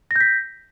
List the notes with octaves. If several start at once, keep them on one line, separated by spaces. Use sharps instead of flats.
G6 A#6 B6